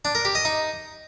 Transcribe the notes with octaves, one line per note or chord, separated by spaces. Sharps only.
D4
A#4
G4
D#5
D#4